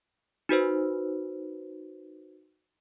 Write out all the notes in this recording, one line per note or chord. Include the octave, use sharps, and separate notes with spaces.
D#4 F#4 B4 C5